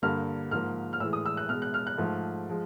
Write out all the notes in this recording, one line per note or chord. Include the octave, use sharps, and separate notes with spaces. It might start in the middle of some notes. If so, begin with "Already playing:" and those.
G2 D3 G3 A#3 F6
G#2 F3 A#3 F6
F6
A2 E3 G#3 E6
D#6
E6
F#6
B2 G#3 F6
F#6
F6
F#6
G#2 F3 A3
F3 G#3